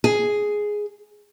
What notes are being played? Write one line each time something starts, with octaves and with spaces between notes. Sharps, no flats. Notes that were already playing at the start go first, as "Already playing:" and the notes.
G#4